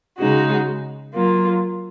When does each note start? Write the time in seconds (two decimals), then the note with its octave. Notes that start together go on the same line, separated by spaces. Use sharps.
0.18 C#3 G#3 D#4 F#4
1.14 F#3 A#3 F4